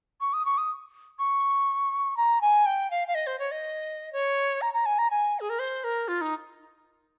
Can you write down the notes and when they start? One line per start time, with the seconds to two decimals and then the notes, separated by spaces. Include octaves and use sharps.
0.21 C#6
0.33 D#6
0.45 C#6
0.58 D#6
1.19 C#6
2.17 A#5
2.41 G#5
2.66 G5
2.91 F5
3.08 F5
3.15 D#5
3.27 C5
3.39 C#5
3.51 D#5
4.13 C#5
4.62 A#5
4.74 A#5
4.86 G#5
4.98 A#5
5.10 G#5
5.40 G#4
5.50 A#4
5.59 C5
5.84 A#4
6.08 F4
6.21 D#4